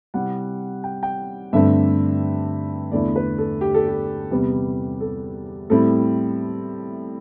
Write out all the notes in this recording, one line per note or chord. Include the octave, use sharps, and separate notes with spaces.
C3 G3 C4 E4 F#5
G5
G5
G2 D3 A3 C4 E5
E2 D3 A3 E4 D5
B4
A4
G4
A4
G4
E2 C3 G3 B3 G4
A4
A2 G3 C4 E4 A4